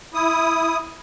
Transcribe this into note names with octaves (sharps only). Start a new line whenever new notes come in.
E4 D#6